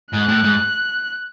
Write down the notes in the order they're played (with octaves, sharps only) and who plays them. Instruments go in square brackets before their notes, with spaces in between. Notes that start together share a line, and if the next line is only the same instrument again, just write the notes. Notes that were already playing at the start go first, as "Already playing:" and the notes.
[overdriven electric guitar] G#2 [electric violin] F#6
[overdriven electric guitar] A2
G#2